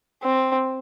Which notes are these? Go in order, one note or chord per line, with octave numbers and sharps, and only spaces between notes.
C4